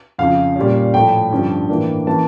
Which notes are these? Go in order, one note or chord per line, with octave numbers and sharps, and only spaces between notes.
F2 C#3 F3 F5
A#2 G3 C#4
A2 F3 A3 G5
G2 D3 F3 C#4
A2 E3 A#3 D4
E3 A#3 C#4 A5